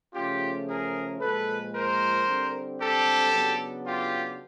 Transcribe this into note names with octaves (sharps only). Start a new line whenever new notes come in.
C#3 F3 A3 C#4 F4 G4
G#4 A#4
A#2 F3 G#3 A4 B4
A#4 C5
D3 G3 C4
G4 A4
C#3 F#3 B3 D4
F4 G4